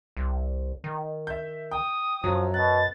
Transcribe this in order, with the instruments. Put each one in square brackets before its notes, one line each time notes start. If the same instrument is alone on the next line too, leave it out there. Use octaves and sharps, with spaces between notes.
[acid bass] C2
D#3
[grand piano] E5 G6
[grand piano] G5 [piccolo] D#6
[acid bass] F#2 [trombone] F3 [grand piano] F#3
[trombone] B2 [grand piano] F#6 [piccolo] A6